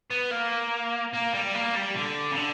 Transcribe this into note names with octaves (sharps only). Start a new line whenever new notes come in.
B3
A#3
A#3
G3
A#3
G3
D3
C#3
D3